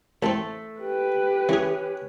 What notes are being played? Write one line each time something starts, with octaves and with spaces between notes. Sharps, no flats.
A1 A3 C4 A4
G4 B4
E3 C#4 G#4